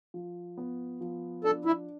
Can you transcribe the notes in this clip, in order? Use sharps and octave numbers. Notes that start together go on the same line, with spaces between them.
F3
B3
F3
D4 A4
E4